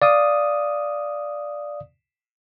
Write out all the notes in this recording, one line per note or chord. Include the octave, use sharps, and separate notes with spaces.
D5 F5 D#6